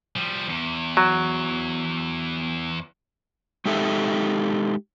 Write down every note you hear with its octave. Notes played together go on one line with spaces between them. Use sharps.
F3 G3
E2
F#3
G#3 D#4 G4 A4 E5